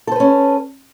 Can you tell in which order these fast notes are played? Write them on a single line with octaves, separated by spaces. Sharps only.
A4 C5 B4 C#4